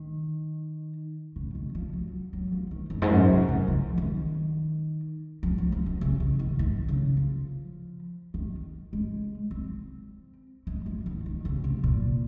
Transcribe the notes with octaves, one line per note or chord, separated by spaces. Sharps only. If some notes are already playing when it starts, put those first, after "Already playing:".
Already playing: D#3
C#3
D#3
F3
F#3
F#3
F3
D#3
F2
G#2
F#2
C3
C#3
F3
D#3
F3
F#3
F3
D#3
C#3
D#3
D#3
D#3
C#3
F3
D#3
G#3
C4
G#3
F3
D#3
D#3
C#3
C3
A#2